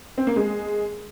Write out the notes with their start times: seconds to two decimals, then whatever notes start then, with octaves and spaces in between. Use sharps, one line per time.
0.18 C4
0.27 A#3
0.36 G#3